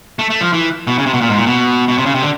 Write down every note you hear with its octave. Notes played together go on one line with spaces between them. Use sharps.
A3
A3
F3
E3
B2
C#3
C3
B2
A#2
G#2
A#2
B2
B2
C3
C#3
C3
D3